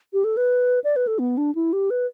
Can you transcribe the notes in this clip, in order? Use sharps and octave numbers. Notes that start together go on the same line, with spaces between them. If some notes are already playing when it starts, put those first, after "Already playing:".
G4
A4
B4
D5
B4
A4
B3
D4
E4
G4
B4